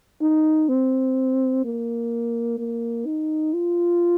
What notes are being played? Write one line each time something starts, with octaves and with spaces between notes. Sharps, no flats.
D#4
C4
A#3
A#3
D#4
F4